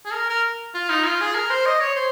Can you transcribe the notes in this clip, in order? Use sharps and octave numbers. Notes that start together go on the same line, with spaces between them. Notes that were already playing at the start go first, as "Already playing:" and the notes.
G#4
A#4
A#4
F4
D#4
F4
G#4
A#4
C5
D#5
C#5
C5